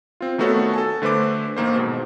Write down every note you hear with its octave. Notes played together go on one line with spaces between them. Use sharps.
C4 F4
D#3 A3 B3 F#4 A4 C#5
A4 G#5 A5
D3 A3 B4 C5 D6
A1 D#3 A#3 C5
G#2 B2